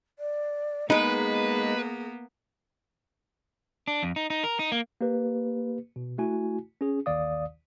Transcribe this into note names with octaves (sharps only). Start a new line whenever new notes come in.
D5
G#3 A#3 B3 D#4 G#4 B4
D4
F2
D#4
D#4
A#4
D#4
A#3
A#3 G4 B4
B2
A3 E4 F#4 G#5
C#4 G#4
A1 D#2 D#3 D5 F5 D#6